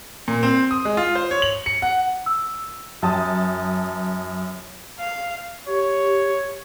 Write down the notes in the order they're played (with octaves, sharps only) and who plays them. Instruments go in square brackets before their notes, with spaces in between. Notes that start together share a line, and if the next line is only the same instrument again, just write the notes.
[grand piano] A#2
C4
D#6
G#3
F4
C5
C#5
F#7
C#7
F#5
[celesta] E6
[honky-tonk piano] F#2 G5 A5 D#6
[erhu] F5
[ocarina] G4 [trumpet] C#5